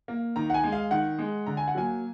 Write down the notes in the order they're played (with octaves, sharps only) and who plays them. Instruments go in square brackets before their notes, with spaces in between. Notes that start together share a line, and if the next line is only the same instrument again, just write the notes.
[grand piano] A#3
D#3 A#5
F#5
G#5
G#3
F5
D#3 F#5
G#3
D3 A#5
G#5
F#5
F#3 A#3 G#5